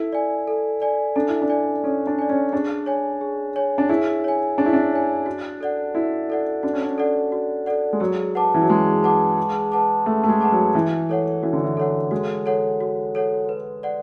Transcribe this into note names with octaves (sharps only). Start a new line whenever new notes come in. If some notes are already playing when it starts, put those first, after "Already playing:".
Already playing: E4 A4
D5 G#5
A4
D5 G#5
D4 A4
E4
D4
D5 G#5
C#4 A4
D4
D5 G#5
C#4
D4 G#4
C#5 G#5
G#4
C#5 G#5
D4
E4 G#4
C#5 G#5
D4 G#4
E4
D4
C#5 G#5
F#4
A4 D5 F#5
E4 F#4
A4 D5 F#5
D4 F#4
C#4
D4
A4 D5 F#5
F#4
A4 D5 F#5
G#3
F#3 G#4
B4 F#5 A5 D6
E3
F#3
G#3 G#4
B4 F#5 A5 D6
G#4
B4 F#5 A5 D6
A3 G#4
A3
G#3
B4 F#5 A5 D6
F#3
E3 F#4
A4 C#5 F#5
E3 F#4
D3
E3
A4 C#5 F#5
G#3 F#4
A4 C#5 F#5
F#4
A4 C#5 F#5
B4
D5 F#5